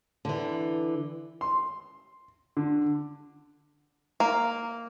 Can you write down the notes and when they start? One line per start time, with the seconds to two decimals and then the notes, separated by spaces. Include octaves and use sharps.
0.25 D3 E3
1.41 C6
2.57 D3
4.20 A#3